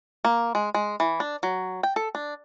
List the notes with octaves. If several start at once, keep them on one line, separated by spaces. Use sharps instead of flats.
A#3
G#3
G#3
E3
D4
F#3
G5
A4
D4